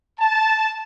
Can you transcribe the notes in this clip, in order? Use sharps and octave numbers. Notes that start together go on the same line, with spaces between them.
A5